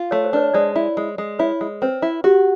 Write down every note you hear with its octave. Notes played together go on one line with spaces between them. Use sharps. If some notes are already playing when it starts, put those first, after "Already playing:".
Already playing: F4
A3 C#5
C5
D4 B4 C#5
G#3 C5 D5
E4
G#3
G#3
E4 B4 C#5
G#3
C4 B4
E4
F#4 G4